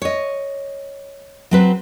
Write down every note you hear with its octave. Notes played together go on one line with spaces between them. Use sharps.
C#5 D#5
F#3 C4 B4